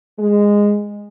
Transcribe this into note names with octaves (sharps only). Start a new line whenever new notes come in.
G#3